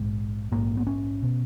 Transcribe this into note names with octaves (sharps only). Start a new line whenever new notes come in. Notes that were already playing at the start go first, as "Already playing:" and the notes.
Already playing: A#1 G#2 G#3
A#1 G#2 A#3
B3
C#4
B2